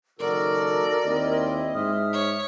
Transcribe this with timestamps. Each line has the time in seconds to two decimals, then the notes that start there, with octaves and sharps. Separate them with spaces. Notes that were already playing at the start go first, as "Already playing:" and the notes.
0.19 F#1 D#3 F#4 A4 A#4 D5
1.05 D#2 C4 E4 D#5
1.75 G#2 E5 D#6 F6
2.13 C#5